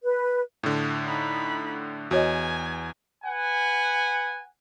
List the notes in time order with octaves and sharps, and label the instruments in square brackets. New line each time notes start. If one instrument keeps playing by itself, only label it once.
[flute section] B4
[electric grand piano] A2 D3
[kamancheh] D#4 B5
[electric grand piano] E2 [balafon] F#4 C#5 D#5 [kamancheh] G#5
[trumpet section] B4 F#5 G#5